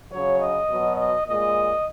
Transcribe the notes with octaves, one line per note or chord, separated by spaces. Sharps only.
C#3 F#3 C#5
D#5
B2 F#3
D#5
A#2 G#3 D#5